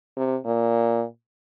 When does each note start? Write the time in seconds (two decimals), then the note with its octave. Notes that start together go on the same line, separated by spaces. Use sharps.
0.17 C3
0.45 A#2